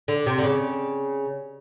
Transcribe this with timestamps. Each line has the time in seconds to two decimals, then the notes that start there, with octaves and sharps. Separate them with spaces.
0.08 D3
0.26 C3
0.38 D3
0.44 C#3